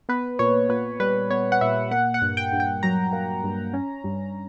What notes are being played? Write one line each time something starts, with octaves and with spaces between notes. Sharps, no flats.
B3 B4
A#2 C#5
A#2 B4
G3 B4
B3 C#5
F#5
A#2 E5
A#3 F#5
F#5
G2
G5
G2
G5
F#3 A#5
A#3
G2
C#4
G2